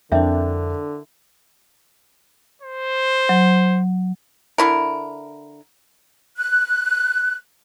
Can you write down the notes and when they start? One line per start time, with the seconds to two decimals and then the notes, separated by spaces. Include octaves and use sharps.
0.12 F2 D3 C4 D4 E4 A#4 E5 G5
2.62 C5
3.29 F#3
4.58 D3 E4 A#4
6.37 F#6